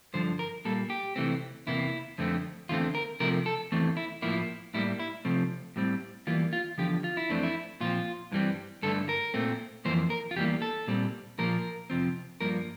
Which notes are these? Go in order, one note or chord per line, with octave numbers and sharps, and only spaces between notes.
G2 D3 F3 C5
A#4
A#2 G3 A#3 A4
G4
C3 E3 A3 C4
E2 C3 E3 A#3 E4
F2 D3 A3 C4
E2 D3 A3 C4 F4
A#4
C3 F3 A3 A#4
A4
E2 E3 A3 C4
E4
A2 F3 A#3 E4
A2 G3 A#3 E4
E4
C3 F3 A3 C4
A2 G3 C4
E2 E3 G3 A#3 F4
F4
E2 D3 F3 G4
F4
E4
F2 E3 A3 C4 D4
E4
A#2 F3 C4 F4
G2 E3 G3 C4
G2 D3 A3 A4
A#4
A#2 A3 C4
F2 E3 A#3 C5
A#4
F4
E2 E3 G3 A#3 G4
A4
A#2 G3 C4
A#2 F3 A#3 A#4
F2 C3 F3 C4
G2 F3 A#3 A#4